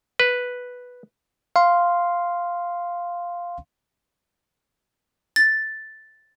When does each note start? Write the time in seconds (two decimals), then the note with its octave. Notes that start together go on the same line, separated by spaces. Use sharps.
0.20 B4
1.56 F5 C6
5.36 A6